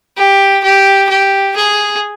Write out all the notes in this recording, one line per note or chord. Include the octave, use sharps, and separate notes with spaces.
G4
G4
G4
G#4